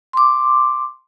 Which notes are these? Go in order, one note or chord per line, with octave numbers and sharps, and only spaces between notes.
C6 D6